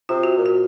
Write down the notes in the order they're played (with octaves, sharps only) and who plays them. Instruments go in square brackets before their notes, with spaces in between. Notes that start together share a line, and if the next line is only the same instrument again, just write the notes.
[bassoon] C3 [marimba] F4
[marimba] F#4
[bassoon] A#2
[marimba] F#4